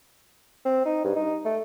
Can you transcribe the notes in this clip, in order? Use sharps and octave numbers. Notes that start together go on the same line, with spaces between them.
C4
D#4
G2
D#4
A3